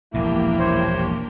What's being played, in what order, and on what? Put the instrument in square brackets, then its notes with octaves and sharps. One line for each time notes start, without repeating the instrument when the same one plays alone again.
[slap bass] E1 A#1 G2 [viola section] A#3 D4 G4 [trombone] E4
[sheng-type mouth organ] C5 C#5